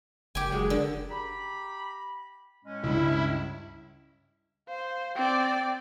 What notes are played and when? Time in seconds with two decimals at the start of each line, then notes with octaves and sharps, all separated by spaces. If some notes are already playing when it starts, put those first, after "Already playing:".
0.35 F#1 G4 G#5
0.52 F#3 G#3
0.70 D3
1.10 G4 A#5 B5
2.65 A2 G#3 C#4
2.83 C#2 G2 E4
4.68 C5 F5
5.15 C4 D5 G5